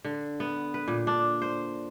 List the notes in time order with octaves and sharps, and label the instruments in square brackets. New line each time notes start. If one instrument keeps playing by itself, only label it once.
[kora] D3
B3
B4
A#2
D4
C5